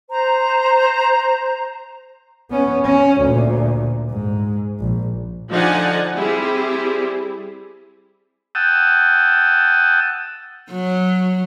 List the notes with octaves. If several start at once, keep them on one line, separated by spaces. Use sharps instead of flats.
C5 A#5
B3 C#4
C#4
D2 A#2
G#2
A#1
D3 F3 D#4 D5 F#5 G#5
G3 C4 E4 G4 G#4
F#5 G5 A5 D#6 E6
F#3